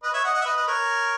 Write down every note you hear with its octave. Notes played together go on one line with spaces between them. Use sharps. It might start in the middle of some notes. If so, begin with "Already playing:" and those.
B4 D#5
C#5 E5
D#5 F#5
D#5 F#5
E5
B4 D#5
B4 D#5
A#4 C#5